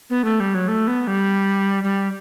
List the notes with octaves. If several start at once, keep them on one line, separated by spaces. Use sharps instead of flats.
B3
A3
G3
F#3
A3
B3
G3
G3